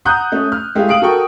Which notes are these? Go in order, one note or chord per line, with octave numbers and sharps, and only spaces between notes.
F#5 A#5 D#6 F#6 G6
A3 C#4
F6
G#3 A3 E4 G4 G#4 F5
F5 D#6 D7 F#7
F#4 A4 A#4 G5 C#6